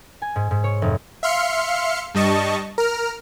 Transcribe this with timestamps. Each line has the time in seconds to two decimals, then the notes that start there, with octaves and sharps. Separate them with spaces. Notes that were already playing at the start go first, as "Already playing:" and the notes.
0.22 G#5
0.36 G#2
0.51 G#2
0.64 C#5
0.82 F1
1.23 E5 F5 C6 F6 C#7
2.15 G2 G3 D#5 A5 C#6
2.78 A#4 F6